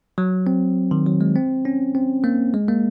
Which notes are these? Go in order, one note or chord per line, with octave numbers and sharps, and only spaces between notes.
F#3
C4
D#3
F#3
G#3
C4
C#4
C4
A#3
G#3
A#3